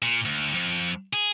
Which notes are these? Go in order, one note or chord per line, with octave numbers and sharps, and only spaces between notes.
A#2
D2
F2
G#4